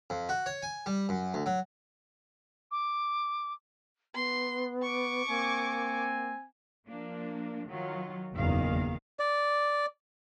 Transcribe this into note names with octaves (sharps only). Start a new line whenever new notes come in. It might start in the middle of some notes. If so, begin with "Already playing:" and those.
F2
F#4
C#5
G#5
G3
F#2
D2
F#3
D6
B3 C6
C#6 D6
A#3 C4 G#5
F3 A#3 D4
D#3 F#3 F4
F#1 E2 A#2 D#3 F5
D5